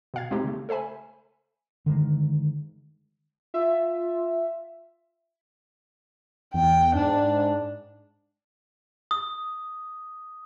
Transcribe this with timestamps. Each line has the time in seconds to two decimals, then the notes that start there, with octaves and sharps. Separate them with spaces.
0.14 B2 F5 G#6
0.31 G#3 A3 C4 D#4 G4
0.44 C#3 A3
0.69 A4 C5 E5 G#5 B5
1.86 D3 D#3 G#3
3.54 F4 E5
6.54 E2 G5
6.95 G#2 D4
9.11 D#6